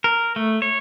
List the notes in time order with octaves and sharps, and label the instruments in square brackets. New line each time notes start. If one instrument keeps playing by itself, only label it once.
[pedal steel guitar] A#4
A3
C#5